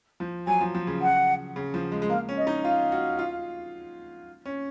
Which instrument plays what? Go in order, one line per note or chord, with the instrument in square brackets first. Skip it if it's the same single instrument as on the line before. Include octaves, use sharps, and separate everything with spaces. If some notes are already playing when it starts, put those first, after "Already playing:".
[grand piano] F3
[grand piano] F#3 [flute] G#5
[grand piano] F3
F3
C#3
[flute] F#5
[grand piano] C#3
F3
G#3
G#3
[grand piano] A#3 [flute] F5
[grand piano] C#4
[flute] D#5
[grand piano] D#4
[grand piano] F4 [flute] F5
[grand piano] F#4
F4
C#4